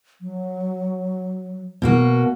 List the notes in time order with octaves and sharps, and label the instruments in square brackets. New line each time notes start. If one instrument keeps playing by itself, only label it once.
[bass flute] F#3
[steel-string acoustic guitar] B2 A#3 F#4